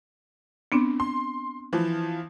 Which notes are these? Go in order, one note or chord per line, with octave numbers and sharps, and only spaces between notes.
B3 C4 D4
C6
E3 F3